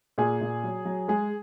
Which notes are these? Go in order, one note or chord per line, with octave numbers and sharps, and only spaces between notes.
A#2 G#4
A#2
F#3
F#3
G#3 G#4